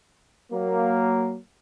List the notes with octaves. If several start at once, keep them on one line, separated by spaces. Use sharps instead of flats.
F#3 A#3